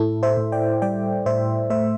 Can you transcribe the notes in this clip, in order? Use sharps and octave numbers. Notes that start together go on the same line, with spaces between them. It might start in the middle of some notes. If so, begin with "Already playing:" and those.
Already playing: A2 E4 A4
C5 E5
A2
D5 G5
G3 D5 G5
A2 C5 E5
A3 C5 E5